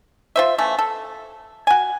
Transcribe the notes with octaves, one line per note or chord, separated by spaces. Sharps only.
F4 C5 E5
E3 A3 C#4
A4
F#4 G#5